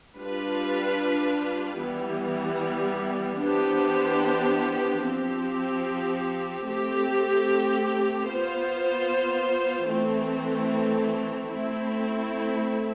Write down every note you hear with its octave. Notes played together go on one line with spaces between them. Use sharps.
G3 D4 F4 B4
E3 G3 B3
E3 B3 D4 G4 C5
F3 C4 G4
A3 C4 G4
B3 F4 C5
E3 A3 C4
A3 C4 E4